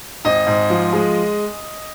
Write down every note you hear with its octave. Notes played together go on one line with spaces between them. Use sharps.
G#1 D#5
G#2
F3
G#3